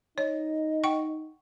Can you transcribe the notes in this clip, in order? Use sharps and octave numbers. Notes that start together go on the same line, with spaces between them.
D#4 C#5 D#5
F#5 G5 C#6